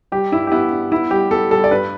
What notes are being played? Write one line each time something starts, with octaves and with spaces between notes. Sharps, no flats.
G3 G4
G2 E4
G4
B3 E4
G2
B3 E4
G3 G4
B3 A4
G3 A4
D5
G2 B4